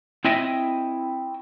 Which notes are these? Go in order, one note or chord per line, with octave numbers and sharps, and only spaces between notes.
C4 E4 C#5 D#5 E5 G5